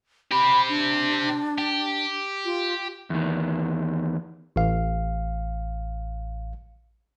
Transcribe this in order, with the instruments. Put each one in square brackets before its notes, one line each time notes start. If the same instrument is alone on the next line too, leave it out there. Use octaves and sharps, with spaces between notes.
[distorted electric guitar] C4 G4 [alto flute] B5
[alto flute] D4
[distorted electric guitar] G4
[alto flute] F4
[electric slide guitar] E2 D#3
[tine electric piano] A1 F5